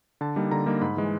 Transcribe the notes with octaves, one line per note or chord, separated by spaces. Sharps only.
D3 A5
G3 A#3 D#4
D3 A#5
G3 A#3 D#4
G#2 B5
E3 G#3